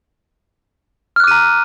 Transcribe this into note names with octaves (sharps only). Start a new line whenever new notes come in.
A#5 D6 F6 F#6 D#7